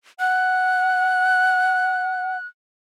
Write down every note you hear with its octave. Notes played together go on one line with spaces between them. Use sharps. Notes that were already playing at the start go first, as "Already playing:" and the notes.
F#5 F#6